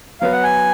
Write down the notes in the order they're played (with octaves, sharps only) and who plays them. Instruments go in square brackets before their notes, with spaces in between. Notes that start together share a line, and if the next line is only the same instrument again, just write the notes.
[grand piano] F#3 B3 F#4 B4 [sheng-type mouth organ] F5
[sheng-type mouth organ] F#5
G#5